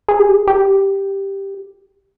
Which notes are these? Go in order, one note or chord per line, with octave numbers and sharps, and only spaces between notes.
G#4
G4
G#4
G4